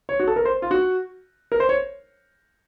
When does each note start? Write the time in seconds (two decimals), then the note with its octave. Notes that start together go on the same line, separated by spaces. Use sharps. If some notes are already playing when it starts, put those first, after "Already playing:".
0.09 C#5
0.20 F#4
0.27 A4
0.36 A#4
0.45 C5
0.62 F4
0.71 F#4
1.52 A#4
1.60 C5
1.69 C#5